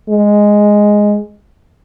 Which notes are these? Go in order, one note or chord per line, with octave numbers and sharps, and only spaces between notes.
G#3